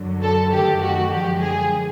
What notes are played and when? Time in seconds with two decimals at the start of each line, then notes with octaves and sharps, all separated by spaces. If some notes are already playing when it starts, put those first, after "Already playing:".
Already playing: F#2 D3 F#3
0.22 A4
0.52 F#2 D#3 F#3 A3 G4
0.81 F#4
1.10 F#2 D3 F3 G#3 G4
1.41 G#4